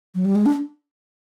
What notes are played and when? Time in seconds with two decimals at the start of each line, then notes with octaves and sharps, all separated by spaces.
0.15 F#3
0.25 G3
0.35 G#3
0.46 D4